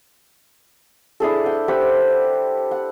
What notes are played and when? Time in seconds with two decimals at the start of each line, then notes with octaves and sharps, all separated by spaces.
1.20 D4 E4 G#4 A4
1.45 F#5 G5
1.68 G4 C5 F#5 B5
2.71 F#5